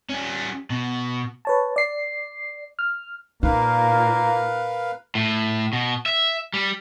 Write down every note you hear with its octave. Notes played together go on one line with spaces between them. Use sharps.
G3 C#4
B2
B4 C#5 A5
D5 C7
F6
A#2 A#3 D#4 A#4 B4 F5
A2
B2
E5
G3